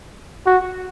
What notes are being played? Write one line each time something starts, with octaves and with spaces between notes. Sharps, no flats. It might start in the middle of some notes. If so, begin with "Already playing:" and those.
F#4